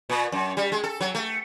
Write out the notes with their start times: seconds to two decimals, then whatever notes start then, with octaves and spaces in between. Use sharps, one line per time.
0.09 A#2
0.32 F#2
0.57 G3
0.72 G#3
0.84 A4
1.00 F#3
1.15 A3